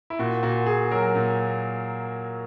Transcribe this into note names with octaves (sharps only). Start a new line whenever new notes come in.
E4
A#2 F#4
A#2 F#4
A#2 G#4
F#3 A#4
A#2